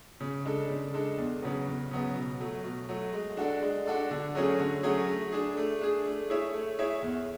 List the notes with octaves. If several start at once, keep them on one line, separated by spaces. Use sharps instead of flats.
C#3
G#3 D4 A4
C#3
G#3 D4 A4
E2
C#3 F#3 B3
E2
C#3 F#3 B3
B2
F#3 A3
B2
F#3 A3
G#3
D4 F#4 A4 D5
G#3
D4 F#4 A4 D5
D3
F#3 A3 C#4 G#4
D3
F#3 A3 C#4 G#4
A3
D4 G#4
A3
D4 G#4
A3
E4 G#4 C#5 E5
A3
E4 G#4 C#5 E5
E2